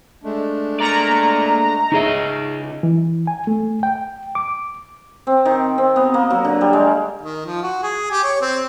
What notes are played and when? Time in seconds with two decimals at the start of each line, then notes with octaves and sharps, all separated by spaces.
0.23 G#3 A3 D4
0.80 A#3 D5 A#5
1.92 C#3 D#4 G#4 D#5 E5
2.83 E3
3.27 G#5
3.47 A3
3.83 G5
4.35 D6
5.27 C4
5.45 D#3
5.78 C4
5.96 B3
6.14 A#3
6.30 F#3
6.44 D3
6.61 G3
6.73 G#3
7.21 D#3
7.46 F3
7.63 F#4
7.83 G#4
8.11 G4
8.23 C#5
8.41 C4